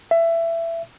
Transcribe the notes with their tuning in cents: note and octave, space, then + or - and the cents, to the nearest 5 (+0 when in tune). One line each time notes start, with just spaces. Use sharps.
E5 +20